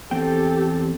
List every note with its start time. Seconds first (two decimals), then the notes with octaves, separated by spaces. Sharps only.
0.11 E2 C4 G4 A4 G5